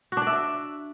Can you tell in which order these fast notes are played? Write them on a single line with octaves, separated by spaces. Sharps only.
F#4 D4 D5 E5